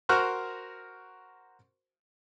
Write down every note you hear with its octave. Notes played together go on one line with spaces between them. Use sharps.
F#4 A#4 C5 C#6 F6 F#6